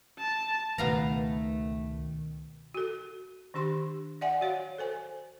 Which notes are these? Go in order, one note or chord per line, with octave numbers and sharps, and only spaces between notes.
A5
C#2 B2 D#3 A3 B3 F5 A#5
F#4 A4
D#3 D4 G4 C6
D5 E5 F#5 G#5
F#4 C#5 F5
A4 C5 G#5